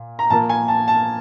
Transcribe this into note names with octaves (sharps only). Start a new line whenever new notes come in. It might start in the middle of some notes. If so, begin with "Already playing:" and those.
Already playing: A#2
A#5
A#2 F3 A#3 A5
G#5
A5
A5